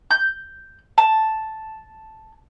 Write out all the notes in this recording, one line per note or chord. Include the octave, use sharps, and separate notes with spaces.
G6
A5